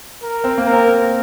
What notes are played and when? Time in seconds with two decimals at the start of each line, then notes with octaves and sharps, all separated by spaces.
0.22 A#4
0.44 C4
0.58 A#3
0.67 A#4
0.72 C4